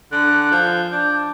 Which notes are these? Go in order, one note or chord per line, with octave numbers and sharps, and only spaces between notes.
D3 F#6
F3
D4 G6